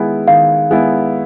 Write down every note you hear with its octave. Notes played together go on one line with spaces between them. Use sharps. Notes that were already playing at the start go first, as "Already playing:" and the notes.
Already playing: D#3 G#3 B3 E4
D#3 F5
G#3 B3 E4